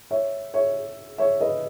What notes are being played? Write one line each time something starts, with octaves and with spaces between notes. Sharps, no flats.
C#5 E5
C#5 E5
C#5 E5
B4 D#5